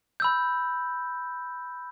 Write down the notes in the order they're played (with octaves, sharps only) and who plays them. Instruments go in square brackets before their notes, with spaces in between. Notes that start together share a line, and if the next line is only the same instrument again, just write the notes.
[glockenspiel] B5 E6 G6